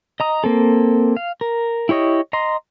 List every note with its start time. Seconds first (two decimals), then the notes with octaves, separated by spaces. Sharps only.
0.20 D#5 A#5 D#6
0.44 A#3 C4 A4
1.17 F5
1.41 A#4
1.89 E4 G4 C#5 D#5
2.33 D#5 A#5 C6